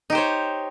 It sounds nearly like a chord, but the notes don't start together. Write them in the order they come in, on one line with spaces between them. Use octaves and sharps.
D#4 G4 C5 C#5